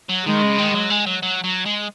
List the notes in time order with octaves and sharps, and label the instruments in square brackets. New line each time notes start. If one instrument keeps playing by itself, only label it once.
[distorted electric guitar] F#3
[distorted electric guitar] D#3 [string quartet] G#3
[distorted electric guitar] C#3
D#3
F#3
G#3
F#3
F#3
F#3
G#3